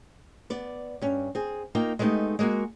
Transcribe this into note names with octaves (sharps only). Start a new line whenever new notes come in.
B3 D5
G2 C#4
C4 G#4
A#3 D#4 F4 G5
G#3 A3 B3 C#4 D#4 G4
G#3 A#3 F#4